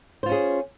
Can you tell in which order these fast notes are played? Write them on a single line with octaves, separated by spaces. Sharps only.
C5 F4 C#4 G#4